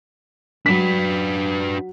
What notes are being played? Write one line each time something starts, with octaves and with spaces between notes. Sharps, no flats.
F#3 D4 B4 B6